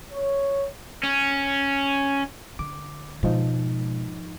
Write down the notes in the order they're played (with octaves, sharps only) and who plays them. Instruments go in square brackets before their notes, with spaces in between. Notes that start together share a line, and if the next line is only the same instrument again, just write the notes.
[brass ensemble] C#5
[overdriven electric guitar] C#4
[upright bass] D3 [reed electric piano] D6
[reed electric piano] G#2 F3 D#4 [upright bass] B2 G#3